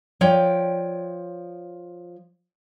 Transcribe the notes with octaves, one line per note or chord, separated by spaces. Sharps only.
F3 C#5 D5 G5